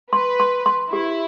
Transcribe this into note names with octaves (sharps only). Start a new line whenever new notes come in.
B4 C6
C6
C6
E4 G4